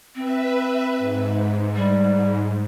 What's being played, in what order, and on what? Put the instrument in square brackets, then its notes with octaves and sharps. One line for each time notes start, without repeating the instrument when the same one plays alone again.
[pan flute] C4 [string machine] B4 E5
[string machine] G#2
[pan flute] G3